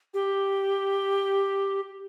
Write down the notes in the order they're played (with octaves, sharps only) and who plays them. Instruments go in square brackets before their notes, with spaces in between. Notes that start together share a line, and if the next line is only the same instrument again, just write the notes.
[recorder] G4